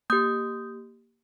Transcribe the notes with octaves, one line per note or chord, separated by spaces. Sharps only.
A#3 G4 D#6 G6